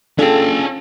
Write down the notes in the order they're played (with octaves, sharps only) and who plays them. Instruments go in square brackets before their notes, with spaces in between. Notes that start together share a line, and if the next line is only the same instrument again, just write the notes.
[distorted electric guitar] C#4 G5 [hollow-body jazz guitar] D4 F4 G#4 [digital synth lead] A4